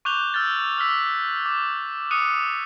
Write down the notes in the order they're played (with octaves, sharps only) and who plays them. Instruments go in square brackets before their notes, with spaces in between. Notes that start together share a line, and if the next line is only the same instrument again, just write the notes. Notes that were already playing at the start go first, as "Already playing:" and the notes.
[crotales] C#6 D6 F#6 G6 F7 G7
E6 F6 G6 A6
E6 F6 B6
D6
D#6 F#6 C#7 D#7